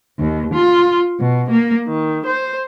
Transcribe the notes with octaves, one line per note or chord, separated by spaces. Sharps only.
D#2
F4
B2
A#3
D#3
C5